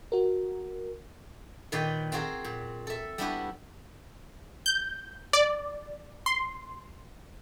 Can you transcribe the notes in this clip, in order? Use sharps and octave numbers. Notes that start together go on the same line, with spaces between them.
F#4 A#4
A#2 D#3 B4 C#5 D5 G5
C4 F4 F#4 G#4 A#4
A#2
A4 E5
G3 B3 D4 E4 F#4 G4
G6
D5
C6